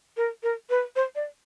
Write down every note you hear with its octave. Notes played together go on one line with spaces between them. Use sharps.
A#4
A#4
B4
C5
D5